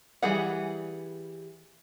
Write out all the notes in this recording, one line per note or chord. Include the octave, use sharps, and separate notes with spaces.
E3 G3 G#4 F#5